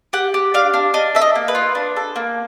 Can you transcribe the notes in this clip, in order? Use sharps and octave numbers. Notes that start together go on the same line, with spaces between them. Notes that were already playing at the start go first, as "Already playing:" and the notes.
G4 F#5
G4
D4 F5
D4
D4 D#5
A4 E5
D#5
A#3
B4
F4
D4
A4
A#3